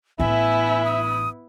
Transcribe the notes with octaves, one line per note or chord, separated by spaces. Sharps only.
A1 B3 D4 E4 E5 G#5
D#6